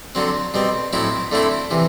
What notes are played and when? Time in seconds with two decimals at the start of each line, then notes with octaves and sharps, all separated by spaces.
0.15 D3 F#3 C4
0.54 B2 G3 C4
0.93 A2 F#3 C4 E4
1.32 D3 A3 C4 E4
1.71 C3 E3